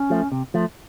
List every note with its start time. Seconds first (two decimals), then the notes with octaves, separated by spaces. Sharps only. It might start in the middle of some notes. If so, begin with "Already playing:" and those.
Already playing: C#4
0.10 F3 A3
0.32 C3
0.54 F3 A3